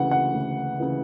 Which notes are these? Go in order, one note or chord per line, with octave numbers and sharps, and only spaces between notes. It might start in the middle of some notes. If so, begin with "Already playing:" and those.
Already playing: D2 C#3 E3 F#5
F#5
D2
C#3 E3